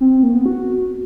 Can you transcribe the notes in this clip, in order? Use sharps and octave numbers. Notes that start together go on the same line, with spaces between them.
C4
C4
A#3
B3
F#4